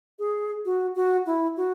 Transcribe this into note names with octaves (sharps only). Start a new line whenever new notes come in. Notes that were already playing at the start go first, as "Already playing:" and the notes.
G#4
F#4
F#4
E4
F#4